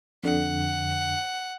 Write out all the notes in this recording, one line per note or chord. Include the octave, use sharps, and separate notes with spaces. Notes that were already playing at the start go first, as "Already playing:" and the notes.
F2 D3 F#5